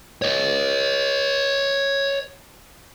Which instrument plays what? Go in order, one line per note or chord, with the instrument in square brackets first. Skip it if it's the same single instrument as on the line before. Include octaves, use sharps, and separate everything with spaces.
[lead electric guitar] C#5 D#5